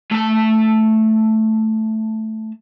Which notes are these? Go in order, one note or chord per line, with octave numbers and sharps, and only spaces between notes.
A3 A5